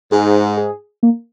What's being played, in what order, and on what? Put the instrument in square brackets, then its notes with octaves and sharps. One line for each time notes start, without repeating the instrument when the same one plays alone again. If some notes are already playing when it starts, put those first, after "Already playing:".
[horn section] G#2 [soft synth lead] G#4
[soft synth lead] G#4
A#3